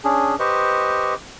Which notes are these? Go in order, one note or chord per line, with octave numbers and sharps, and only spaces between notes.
C#4 D4 G#4
G4 B4 C5 D#5 C#6